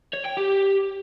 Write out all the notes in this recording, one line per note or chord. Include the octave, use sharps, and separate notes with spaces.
C#5
G5
G4